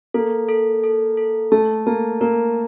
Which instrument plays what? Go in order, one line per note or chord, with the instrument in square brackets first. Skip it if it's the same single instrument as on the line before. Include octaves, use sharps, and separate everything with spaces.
[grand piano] A#3 [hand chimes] A4
[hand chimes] A4
A4
A4
[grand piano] A3 [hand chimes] A5
[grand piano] A#3 [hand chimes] A5
[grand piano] A#3 [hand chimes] A#4